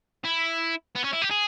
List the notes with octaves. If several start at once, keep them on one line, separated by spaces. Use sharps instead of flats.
E4
B3
C#4
E4
G4
G#4